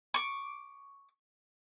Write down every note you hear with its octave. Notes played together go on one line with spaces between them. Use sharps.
C#6 D6